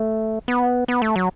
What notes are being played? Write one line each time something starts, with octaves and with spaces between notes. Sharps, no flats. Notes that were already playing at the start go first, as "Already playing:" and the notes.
Already playing: A3
B3
B3
A3
F#3